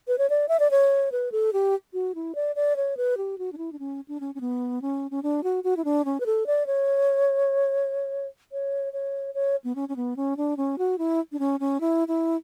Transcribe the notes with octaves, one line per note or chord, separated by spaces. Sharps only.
B4
C#5
D5
E5
D5
C#5
B4
A4
G4
F#4
E4
D5
D5
C#5
B4
G4
F#4
D4
E4
D4
C#4
D4
C#4
C#4
B3
C#4
C#4
D4
F#4
F#4
E4
D4
C#4
B4
A4
D5
C#5
C#5
C#5
C#5
B3
C#4
C#4
B3
C#4
D4
C#4
F#4
E4
D4
C#4
C#4
E4
E4